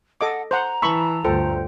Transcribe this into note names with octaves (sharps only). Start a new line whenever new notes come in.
A4 D#5 F#5 D6
C5 F#5 A#5
E3 A5 B5 C#6 E6
D2 G2 F4 A4 C5 G5